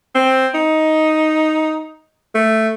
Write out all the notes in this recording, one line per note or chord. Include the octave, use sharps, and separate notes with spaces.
C4
D#4
A3